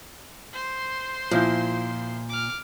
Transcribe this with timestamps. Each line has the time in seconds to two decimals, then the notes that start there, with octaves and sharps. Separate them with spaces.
0.53 C5 C6
1.31 A#2 F3 E4 G6
2.29 D6 F6